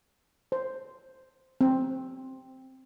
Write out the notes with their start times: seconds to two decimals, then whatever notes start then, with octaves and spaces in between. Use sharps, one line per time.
0.52 C5
1.61 C4